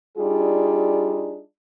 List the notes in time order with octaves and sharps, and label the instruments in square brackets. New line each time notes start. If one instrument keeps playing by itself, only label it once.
[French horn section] G3 D4 D#4 F4 G#4